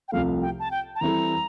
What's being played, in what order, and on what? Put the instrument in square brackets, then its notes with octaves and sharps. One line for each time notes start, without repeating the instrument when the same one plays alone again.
[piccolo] G5
[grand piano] C2 C3 F3 A3 [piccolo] F5
[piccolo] G5
A5
G5
A5
[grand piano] E3 G3 C4 E4 A4 [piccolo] A#5